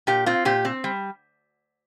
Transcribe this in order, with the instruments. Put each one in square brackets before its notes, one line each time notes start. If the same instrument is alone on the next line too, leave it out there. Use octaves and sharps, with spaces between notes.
[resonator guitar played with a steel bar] A#2 G4
C4 F4
A#2 G4
C4
G3